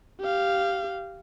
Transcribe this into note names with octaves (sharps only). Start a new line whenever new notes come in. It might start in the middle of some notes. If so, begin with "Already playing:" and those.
G4 F5